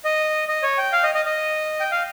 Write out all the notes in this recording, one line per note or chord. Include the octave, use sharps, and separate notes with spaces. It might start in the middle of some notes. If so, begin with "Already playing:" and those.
D#5
D#5
C#5
G5
F5
D#5
D#5
D#5
G5
F5